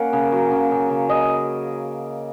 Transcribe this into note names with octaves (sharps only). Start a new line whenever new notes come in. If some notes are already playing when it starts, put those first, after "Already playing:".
Already playing: A#3 C#4 F#5
C#3
F#3
C#3
C#3
C#3
C#4 D#5